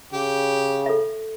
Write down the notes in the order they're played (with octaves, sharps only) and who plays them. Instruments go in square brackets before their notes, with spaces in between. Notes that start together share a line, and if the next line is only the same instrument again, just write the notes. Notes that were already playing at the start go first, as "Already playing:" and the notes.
[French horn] C#3 [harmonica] G4
[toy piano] A4 E5